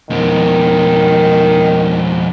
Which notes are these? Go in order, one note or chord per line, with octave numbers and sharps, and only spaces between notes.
F2 B2 D#3